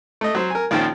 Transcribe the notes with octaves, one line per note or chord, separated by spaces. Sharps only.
A3 D#5
F#3 C5
A#4 G#5
A#1 D#3 F3 C#4 C5 G5